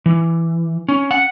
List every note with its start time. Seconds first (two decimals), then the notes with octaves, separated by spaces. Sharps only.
0.06 E3
0.88 C#4
1.11 F#5